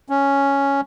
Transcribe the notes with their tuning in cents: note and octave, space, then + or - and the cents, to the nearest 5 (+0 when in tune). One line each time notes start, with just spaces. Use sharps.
C#4 +0